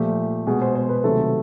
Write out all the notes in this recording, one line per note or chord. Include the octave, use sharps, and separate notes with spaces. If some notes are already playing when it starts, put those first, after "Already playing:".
Already playing: A#2 F3 A3 G4
B2 G#3 G#4
C5
C5
B4
C3 D#3 F#3 A3 A4